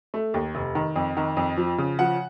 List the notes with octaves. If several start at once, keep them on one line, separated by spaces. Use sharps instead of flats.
A3
D#2
F1
D#3
F2
D#3
F2
F3
C#3
F3 F#5